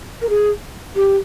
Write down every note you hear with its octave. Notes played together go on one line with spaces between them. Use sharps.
A#4
G#4
G4